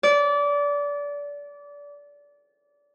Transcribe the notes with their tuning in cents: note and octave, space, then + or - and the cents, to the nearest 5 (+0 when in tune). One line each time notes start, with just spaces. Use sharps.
D5 -25